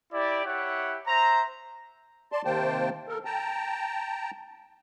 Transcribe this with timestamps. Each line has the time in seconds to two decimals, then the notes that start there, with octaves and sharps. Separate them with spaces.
0.13 E4 G4 D5
0.45 E4 G4 C#5 E5 F#5
1.07 C5 E5 A#5
2.32 D5 A5 C6
2.45 C3 D#3 A#3 C5 G5 A5
3.08 A4 A#4
3.25 G5 A5 A#5